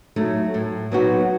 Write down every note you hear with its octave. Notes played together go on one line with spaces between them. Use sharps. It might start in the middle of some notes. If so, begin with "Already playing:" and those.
F#3 A3 D#4
A2
F#3 B3 D#4 F#4